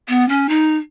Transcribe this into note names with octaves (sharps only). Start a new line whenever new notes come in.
B3
C#4
D#4